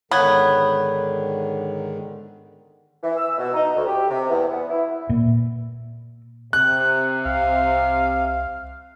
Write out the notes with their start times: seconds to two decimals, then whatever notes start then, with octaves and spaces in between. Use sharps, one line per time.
0.11 G#2 D3 D#3 B3 C#5 F#6 G#6
3.03 E3
3.17 E6
3.38 B2
3.54 D#4
3.75 D2
3.87 G4
4.10 C3
4.28 E2
4.51 B3
4.70 E4
5.09 A#2
6.53 C3 F#6
7.25 C2 F5